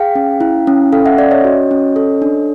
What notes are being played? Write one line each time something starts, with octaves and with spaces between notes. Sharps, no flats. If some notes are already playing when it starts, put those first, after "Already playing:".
Already playing: G#4 F5 G5
C#4
E4
C#4
A4 F5 G5
E5 F#5
C#4 D5 E5
C#5 D#5
F#4
C#4
A4
D4